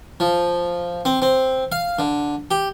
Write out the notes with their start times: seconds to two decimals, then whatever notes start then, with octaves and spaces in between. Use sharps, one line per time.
0.20 F3
1.05 C4
1.22 C4
1.72 F5
1.99 D3
2.51 G4